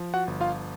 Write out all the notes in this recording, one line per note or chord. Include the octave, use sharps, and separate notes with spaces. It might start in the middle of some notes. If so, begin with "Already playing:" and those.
Already playing: F3
F#4 F#5
G1
F4 F5